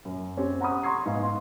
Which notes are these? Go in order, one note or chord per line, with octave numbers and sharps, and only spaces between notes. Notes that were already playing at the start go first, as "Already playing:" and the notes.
F#2
C4 C#4 G4
F#5 A#5 B5 C#6 D#6
A#5 C6 C#6 D#6 G#6 C7
G#2 B3 F5
C6